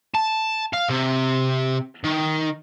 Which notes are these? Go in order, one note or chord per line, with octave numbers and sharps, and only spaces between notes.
A5
F5
C3
D#3